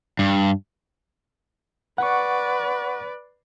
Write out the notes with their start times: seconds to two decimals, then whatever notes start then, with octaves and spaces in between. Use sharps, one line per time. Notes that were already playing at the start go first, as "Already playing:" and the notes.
0.19 G2
1.98 B4 D5 F#5 C#6